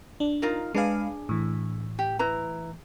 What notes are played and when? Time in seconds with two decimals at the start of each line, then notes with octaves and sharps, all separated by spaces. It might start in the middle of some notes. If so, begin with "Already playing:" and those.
0.20 D4
0.42 D#4 F4 A#4
0.74 G#3 D4 G#4 B4 F5
1.29 A2 E3
1.99 G4
2.19 E4 B4 A#5